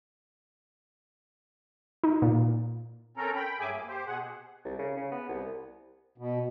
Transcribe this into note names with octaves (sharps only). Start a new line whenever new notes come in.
D#4
A#2
C4 C#4 A4 A#4 A#5
G5 B5
G2 F#3 G#4 E5 G#5 D6
A#3
G4 C5
B2 G#4 F#5
C2
C#3
C#3
B3
C2
B2